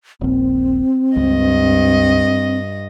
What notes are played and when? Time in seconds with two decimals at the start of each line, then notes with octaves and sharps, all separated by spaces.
0.21 D#1 A#1 C4
1.16 C#2 G2 D#5